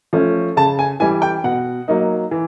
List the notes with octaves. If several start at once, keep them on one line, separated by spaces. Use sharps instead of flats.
F3 A3 C#4
C#3 A5
G#5
E3 G3 G#5
G5
B2 F#5
F#3 A#3 D#4
E3